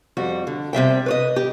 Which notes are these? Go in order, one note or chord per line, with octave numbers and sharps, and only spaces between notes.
F2 G3 F#4
D3
C3 G3 E5 G5
B4 C#5 D#5
G4